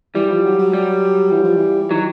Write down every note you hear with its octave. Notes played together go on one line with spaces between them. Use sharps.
E3 G3
F3
F#3
F#3
G3
E3
F3
E3
D#3 F#3